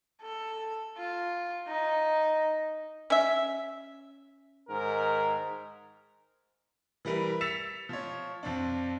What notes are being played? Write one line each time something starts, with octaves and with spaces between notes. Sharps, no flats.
A4
F4
D#4
C#4 E5
G#2 D#3 A#4
E3 G3 A#4 B4
E6 A6 B6 C#7 E7 F7
F3 C#5
F2 C4 D4